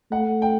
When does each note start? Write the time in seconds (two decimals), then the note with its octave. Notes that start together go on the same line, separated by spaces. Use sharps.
0.11 A3 F#5
0.42 G5